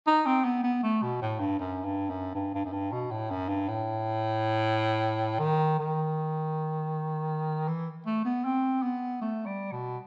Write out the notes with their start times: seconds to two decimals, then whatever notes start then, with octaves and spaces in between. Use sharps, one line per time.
0.07 D#4
0.26 C4
0.44 B3
0.64 B3
0.83 A3
1.03 B2
1.22 A2
1.40 G2
1.60 F#2
1.84 G2
2.10 F#2
2.35 G2
2.54 G2
2.65 F#2
2.73 G2
2.92 B2
3.11 A2
3.31 F#2
3.49 G2
3.68 A2
5.39 D#3
5.79 D#3
7.68 E3
8.07 A3
8.25 B3
8.45 C4
8.83 B3
9.21 A3
9.46 G3
9.72 B2